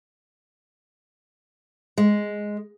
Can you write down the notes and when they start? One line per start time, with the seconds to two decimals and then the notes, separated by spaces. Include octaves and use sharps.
1.98 G#3